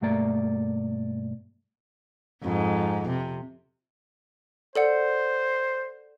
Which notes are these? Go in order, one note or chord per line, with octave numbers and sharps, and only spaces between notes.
B1 G2 A3 A#3 D5 A#5
F2 G#2
C3
A4 C5 D5 F#5